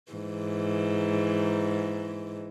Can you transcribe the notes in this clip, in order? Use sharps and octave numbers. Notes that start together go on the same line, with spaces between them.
G#2 E3